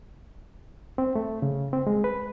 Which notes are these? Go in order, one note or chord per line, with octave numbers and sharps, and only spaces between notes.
C4
A3
C#3
C4
G#3
B4